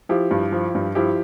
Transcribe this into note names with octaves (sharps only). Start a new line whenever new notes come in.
F3 E4 G4
G2
F3
G2
F3 E4 G4